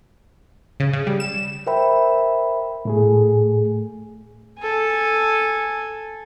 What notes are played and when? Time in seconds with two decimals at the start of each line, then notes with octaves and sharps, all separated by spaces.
0.80 C#3
0.93 C#3
1.07 G3
1.20 E7
1.67 A#4 C5 E5 G5 B5
2.85 A2 A3 G#4
4.59 A4 G#5